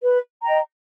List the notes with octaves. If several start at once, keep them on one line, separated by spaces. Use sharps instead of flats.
B4
D#5 G5 A#5